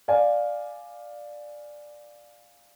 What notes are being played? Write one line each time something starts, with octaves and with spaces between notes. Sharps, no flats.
D5 F5 G#5